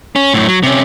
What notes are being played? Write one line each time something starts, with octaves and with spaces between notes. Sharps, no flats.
C#4
F#2 A2
F#3
C3 C#4